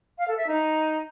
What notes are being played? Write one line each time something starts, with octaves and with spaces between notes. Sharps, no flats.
F5
A4
E5
D#4